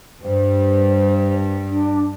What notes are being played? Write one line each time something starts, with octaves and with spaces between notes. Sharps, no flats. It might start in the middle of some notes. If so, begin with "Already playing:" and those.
G2 C5
D4